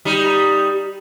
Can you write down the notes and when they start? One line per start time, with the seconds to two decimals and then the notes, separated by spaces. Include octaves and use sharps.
0.05 G3 D#4